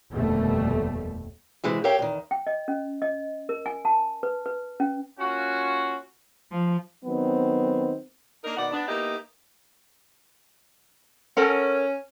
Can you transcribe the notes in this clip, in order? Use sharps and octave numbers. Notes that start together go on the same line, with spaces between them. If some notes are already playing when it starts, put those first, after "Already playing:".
F1 D#2 B2 D3 G3 A3
C3 E3 G#3 E4 F#4
G4 A#4 C#5 E5 F5 G5
E2 D#3
G5
D#5
C#4
D#5
A#4
G#5
A5
B4
B4
C#4
A#3 C#4 F4 F#4
F3
D#3 F#3 B3 C4
A#3 D4 D#4 A#4
B2 D#3 D5 F#5
B3 D4
A#3 B3 D#4 E4 G4
C#4 A4 A#4 F#5